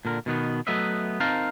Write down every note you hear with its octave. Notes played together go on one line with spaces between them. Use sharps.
A#2 D3 A#4
B2 D#3 B3
F#3 A3 B3 B4 D#5 E5
C4 D#4 A#4 F5 A5